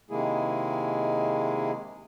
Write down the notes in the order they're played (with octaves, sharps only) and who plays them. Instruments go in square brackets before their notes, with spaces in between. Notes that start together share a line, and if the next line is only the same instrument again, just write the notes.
[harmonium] C3 D#3 G#3 A#3 E4 G#4